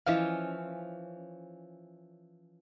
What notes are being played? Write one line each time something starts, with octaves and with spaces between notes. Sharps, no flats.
E3 F3 C#4 E4 D#5 F5